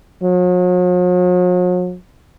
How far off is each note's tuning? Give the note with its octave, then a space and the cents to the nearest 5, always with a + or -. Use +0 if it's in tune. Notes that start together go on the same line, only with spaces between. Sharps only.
F#3 -45